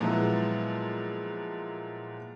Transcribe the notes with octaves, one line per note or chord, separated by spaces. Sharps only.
A#2 F3 F#3 G#3 B3 E4